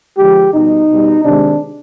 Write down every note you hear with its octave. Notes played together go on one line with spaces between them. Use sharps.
D3 F3 G#3 G4
B2 G3 D#4
B2 G3
C3 D#3 G#3 D4